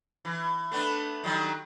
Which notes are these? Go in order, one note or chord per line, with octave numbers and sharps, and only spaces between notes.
E3
A3 B3 D4
D#3 F#3 G3